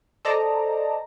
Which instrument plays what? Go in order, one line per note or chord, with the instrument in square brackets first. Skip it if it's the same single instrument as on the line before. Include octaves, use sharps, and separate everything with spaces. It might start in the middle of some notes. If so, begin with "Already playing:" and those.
[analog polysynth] A4 C5 D5 D#5 A5 A#5